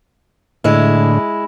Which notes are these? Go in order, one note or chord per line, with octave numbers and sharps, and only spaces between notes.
A2 D3 G#3 E4